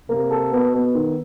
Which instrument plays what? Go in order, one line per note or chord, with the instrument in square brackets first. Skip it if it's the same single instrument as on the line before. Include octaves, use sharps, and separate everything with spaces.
[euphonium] C3 [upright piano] A#3
[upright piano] A4
[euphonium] B2 [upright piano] B3
[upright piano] B3
D#3